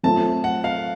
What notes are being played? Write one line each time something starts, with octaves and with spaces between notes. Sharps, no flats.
F#3 A3 C4 F4 A4 A5
F#5
F5